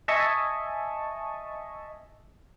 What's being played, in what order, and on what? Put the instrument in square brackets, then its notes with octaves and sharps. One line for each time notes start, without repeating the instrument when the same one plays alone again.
[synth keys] D#5 E5 G#5 A5 C#6